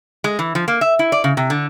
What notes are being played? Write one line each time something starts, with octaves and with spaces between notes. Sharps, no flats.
G#3
E3
F3
A#3
E5
E4
D5
C#3
C3
D3